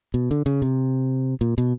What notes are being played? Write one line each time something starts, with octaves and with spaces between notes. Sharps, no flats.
B2
D3
C#3
C3
A#2
B2